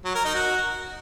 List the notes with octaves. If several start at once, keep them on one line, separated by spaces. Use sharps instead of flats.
F#3
A#4
D#4
F#4